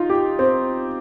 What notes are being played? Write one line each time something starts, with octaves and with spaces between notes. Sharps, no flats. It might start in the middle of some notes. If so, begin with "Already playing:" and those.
Already playing: D#4 F4
G4
C4